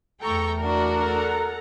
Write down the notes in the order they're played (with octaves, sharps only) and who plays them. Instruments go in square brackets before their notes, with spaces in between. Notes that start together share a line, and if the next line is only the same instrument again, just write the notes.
[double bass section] E2 A3 [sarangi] A4 [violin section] G5 A#5 C#6
[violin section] D4 F#4 [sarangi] A#4
[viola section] A4 F#5 A#5